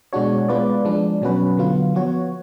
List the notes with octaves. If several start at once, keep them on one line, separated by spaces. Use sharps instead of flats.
B2 G#3 D4 F#4 C#5
G#3 B3 F4 B4 D5
F3 G#3 D4
B2 F#3 C#4 F#4 B4
D3 F#3 B3 F4
F3 B3 F#4 C#5